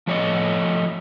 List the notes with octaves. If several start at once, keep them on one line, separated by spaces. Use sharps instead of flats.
F3 A3 C#5 D#5